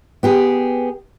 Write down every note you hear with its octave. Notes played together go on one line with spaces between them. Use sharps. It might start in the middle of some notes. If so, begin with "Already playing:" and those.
B3 G4 G#4